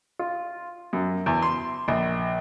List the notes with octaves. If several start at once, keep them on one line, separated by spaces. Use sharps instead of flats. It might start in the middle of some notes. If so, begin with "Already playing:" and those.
F4
F#2
E2
C6
A#1